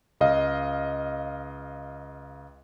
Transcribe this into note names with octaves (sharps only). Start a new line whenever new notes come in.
C#2 D#5 F5